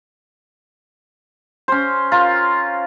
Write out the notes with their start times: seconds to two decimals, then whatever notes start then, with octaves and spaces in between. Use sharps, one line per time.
1.68 C#4 C5
2.12 F4 A#4